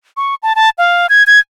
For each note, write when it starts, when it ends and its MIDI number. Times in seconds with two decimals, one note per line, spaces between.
0.17 0.35 85
0.43 0.53 81
0.56 0.70 81
0.78 1.07 77
1.09 1.23 92
1.27 1.39 92